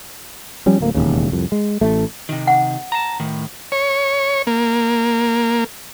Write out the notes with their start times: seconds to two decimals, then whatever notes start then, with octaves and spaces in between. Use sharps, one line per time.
0.66 F3 G3 C#4
0.80 D1 D2 A#3
0.95 E1 A#1 D#2 C#3
1.32 C2 F2
1.52 G#3
1.81 A1 A3
2.29 C3 D#3
2.47 F#5
2.92 A5 A#5
3.20 A2 D#3
3.72 C#5
4.47 A#3